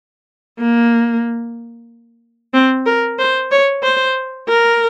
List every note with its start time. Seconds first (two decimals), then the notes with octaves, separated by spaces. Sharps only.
0.59 A#3
2.53 C4
2.86 A#4
3.18 C5
3.51 C#5
3.82 C5
4.48 A#4